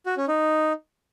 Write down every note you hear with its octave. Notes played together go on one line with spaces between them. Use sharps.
F#4
C#4
D#4